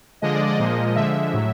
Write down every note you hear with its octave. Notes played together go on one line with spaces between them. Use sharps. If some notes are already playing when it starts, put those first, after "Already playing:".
D3 F3 G#3 D#5
D5
D#5
A#2 F3 G#3
D3 F3 G#3 E5
A2 F#3